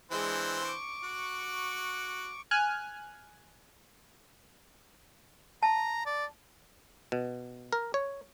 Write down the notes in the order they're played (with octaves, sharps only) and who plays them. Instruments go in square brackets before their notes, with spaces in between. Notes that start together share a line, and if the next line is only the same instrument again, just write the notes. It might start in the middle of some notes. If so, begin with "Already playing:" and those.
[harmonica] E3 C4 C5 [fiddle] G#3 D4
[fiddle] C#6 D6
[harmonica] F#4
[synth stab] G#5 F6 F#6
[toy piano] A5 [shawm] A#5
[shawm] D5
[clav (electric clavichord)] B2
A#4
C#5